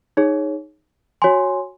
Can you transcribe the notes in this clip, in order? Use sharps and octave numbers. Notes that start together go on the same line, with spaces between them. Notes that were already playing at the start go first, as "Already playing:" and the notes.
D#4 G#4 C#5
F#4 C#5 G#5 C6